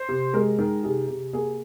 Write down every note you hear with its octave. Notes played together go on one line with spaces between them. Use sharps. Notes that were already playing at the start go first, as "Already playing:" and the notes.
Already playing: C5
C3
G#3 A#4
D#3
C3 G#4
C3
A#3 G#4